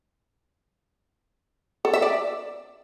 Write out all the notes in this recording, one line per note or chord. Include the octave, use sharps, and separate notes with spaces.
A4
E5
D5